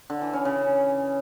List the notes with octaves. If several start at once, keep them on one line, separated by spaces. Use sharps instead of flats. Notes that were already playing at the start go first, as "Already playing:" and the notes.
D3
E3
C#4
C#3